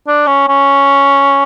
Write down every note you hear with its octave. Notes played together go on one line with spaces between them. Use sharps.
D4
C#4
C#4